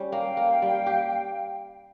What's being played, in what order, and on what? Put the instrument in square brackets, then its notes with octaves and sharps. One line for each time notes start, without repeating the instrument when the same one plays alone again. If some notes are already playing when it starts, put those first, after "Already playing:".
Already playing: [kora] G3 C#4
[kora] A#3 [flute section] F5 G5
[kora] A#3
G3
G4